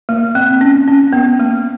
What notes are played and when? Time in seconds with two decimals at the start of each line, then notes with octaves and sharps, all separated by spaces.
0.09 A#3
0.35 C4
0.61 C#4
0.88 C#4
1.13 B3
1.40 A#3